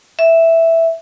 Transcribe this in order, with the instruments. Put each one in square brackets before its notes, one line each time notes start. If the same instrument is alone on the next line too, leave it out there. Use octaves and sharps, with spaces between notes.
[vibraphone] E5